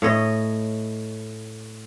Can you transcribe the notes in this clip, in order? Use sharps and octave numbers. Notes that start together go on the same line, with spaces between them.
A2 C#5 D#5